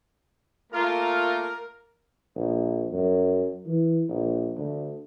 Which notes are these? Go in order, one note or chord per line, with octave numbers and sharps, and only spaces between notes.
A3 A#3 F4 A#4
A#1
F#2
E3
A#1
D2